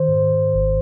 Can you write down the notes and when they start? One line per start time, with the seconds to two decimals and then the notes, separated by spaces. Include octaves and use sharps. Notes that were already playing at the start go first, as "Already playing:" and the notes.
Already playing: D#3 C5
0.08 G#2
0.55 G#1